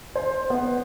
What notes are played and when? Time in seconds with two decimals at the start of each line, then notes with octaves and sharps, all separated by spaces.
0.16 C5
0.50 B3